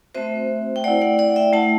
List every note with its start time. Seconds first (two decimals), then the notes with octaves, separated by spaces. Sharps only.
0.15 A3 C4 F#4 C5 E5
0.76 G5
0.84 A3 E4 D5 F#5
1.01 D5 F#5
1.19 D5 F#5
1.36 E5 G5
1.53 A3 E4 F#5 A5